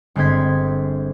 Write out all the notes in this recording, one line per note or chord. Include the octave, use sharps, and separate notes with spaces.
G1 G#3 C4 C5 G#6 B6